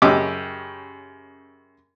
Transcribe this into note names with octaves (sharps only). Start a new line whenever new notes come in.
F#2 C#3 G4 D#5 D6 E6